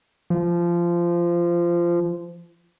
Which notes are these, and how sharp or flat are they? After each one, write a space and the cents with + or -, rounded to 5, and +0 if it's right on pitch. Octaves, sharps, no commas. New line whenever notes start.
F3 -20